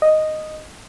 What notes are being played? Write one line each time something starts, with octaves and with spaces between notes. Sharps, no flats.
D#5